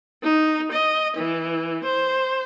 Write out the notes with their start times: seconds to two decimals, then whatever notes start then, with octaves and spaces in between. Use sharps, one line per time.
0.23 D#4
0.72 D#5
1.17 E3
1.84 C5